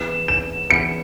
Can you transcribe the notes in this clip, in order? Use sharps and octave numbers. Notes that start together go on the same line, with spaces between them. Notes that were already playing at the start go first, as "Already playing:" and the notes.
Already playing: E3 B3 E4 G#4 B4 E7
E7
E3 B3 E4 G#4 B4 C#7